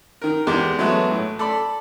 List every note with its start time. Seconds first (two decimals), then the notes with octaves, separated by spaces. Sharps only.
0.22 D#3 A#4
0.47 E2 G#3 G4 D6
0.79 F#3 G#3 A3 B3
1.11 A2
1.39 A4 D5 B5